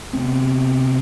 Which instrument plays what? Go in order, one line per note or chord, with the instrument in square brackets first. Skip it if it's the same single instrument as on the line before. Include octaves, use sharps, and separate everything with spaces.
[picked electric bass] C3 B3 C4